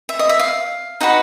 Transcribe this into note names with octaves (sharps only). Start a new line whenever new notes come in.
E5
D#5
E5
F5
D#4 F#4 B4 F#5